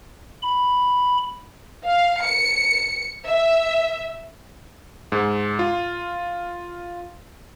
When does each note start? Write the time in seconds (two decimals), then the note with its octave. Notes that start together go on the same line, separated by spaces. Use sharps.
0.43 B5
1.86 F5
2.22 C#7
3.27 E5
5.12 G#2
5.59 F4